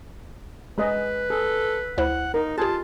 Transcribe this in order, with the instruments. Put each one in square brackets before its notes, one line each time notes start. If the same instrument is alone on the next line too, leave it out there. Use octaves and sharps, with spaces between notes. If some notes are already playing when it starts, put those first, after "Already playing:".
[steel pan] G#3 G#4 D#5 [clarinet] B4
[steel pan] G#4 [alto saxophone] A4
[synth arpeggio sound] D2 E4 C5 [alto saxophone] F#5
[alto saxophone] D#4 [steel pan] A#4
[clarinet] F4 [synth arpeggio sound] G4 G#6 [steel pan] G#4 [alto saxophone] A5